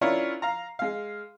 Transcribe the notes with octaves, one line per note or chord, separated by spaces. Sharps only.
C#4 D4 E4 F4 A#4 C#5
F5 A#5
G#3 F5